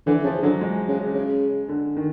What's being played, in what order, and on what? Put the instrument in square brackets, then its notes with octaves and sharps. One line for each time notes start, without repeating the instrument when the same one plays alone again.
[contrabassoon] D3 [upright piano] E3
[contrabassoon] C#3 [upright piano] F3
[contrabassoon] D3 [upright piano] F#3
[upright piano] G#3
[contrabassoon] C#3
C#3
[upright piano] D3
D#3